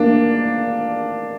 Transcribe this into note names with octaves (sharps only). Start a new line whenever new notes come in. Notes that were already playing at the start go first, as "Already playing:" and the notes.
Already playing: A#3 D4